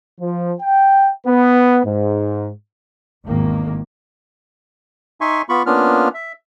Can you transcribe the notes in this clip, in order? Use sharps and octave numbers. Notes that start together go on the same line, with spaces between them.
F3
G5
B3
G#2
G#1 E2 D#3 A#3
D#4 E5 G#5 C6 C#6
B3 F4 B5 C#6
A#3 B3 C#4 D4 F4 F6
E5